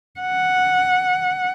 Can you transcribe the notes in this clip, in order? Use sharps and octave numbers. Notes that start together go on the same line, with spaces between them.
F#5